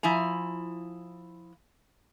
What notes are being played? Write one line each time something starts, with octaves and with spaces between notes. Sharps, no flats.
F3 E4 G#5 A#5